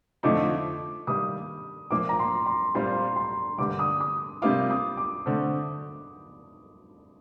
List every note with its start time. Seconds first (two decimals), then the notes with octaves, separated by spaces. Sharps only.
0.23 F2 D3 F3 A3 D#4 D6
1.07 D#3 G3 A#3 D#6
1.91 A#2 F3 A#3 D6
2.09 A#5
2.19 C6
2.46 C6
2.75 A#2 G3 C4 F4 C6
3.16 C6
3.58 G2 D3 G3 A#3 D4 D6
3.79 D#6
4.00 D#6
4.42 C3 G3 A#3 F4 D6
4.70 D#6
4.97 D6
5.26 D3 A3 C4